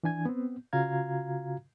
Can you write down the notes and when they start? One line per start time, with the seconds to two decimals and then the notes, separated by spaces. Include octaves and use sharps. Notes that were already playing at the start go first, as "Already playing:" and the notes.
0.03 E3 D4 G#5 G#6
0.25 B3 C4
0.73 C#3 F4 F#4 F5 A#5 G#6